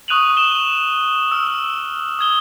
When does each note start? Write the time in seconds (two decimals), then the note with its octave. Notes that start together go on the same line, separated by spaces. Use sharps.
0.08 C#6 D#6 F#6 D#7 F7 F#7
0.37 E7 G7
1.32 E6 F6
2.19 D#6 G#6 G7